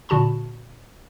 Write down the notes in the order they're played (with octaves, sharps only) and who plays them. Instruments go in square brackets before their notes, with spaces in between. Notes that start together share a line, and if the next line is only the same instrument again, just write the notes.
[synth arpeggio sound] A#2 D3 F#4 A5 B5